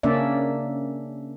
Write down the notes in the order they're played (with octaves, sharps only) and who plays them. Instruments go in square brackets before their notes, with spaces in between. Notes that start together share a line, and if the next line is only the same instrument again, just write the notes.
[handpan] C#3 A#3 C#4 D4 D5 E5